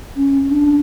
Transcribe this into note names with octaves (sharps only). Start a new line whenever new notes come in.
C#4
D4